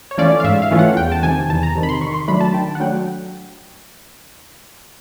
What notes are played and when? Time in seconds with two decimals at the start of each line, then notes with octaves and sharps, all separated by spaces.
0.11 C#5
0.18 E3 A3 C#4 F4 D5
0.40 F5
0.44 G#2 E5
0.62 F5
0.71 E3 A3 C#4 F4
0.79 F#5
0.97 E2 G5
1.12 A5
1.23 C3 D#3 G#5
1.49 E2 A5
1.63 A#5
1.75 C3 D#3
1.83 B5
1.89 C6
2.01 D#3 C#6
2.14 C6
2.28 F#3 A3 D4 B5
2.41 A5
2.54 D#3 G5
2.75 F#5
2.80 F#3 A3 D4 G5